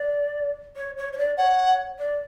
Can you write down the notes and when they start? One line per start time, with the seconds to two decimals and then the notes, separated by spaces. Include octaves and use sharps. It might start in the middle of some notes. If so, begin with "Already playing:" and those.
Already playing: D5
0.76 C#5
0.97 C#5
1.13 C#5
1.17 D5
1.37 C#5 F#5
1.99 D5